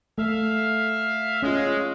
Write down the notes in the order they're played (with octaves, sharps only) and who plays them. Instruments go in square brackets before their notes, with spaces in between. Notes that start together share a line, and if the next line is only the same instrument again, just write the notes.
[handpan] A3 [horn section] E5 F5
[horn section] G#3 [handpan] C#4 F4